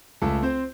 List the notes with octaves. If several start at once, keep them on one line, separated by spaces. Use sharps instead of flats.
C#2 A3 A4
C4 C5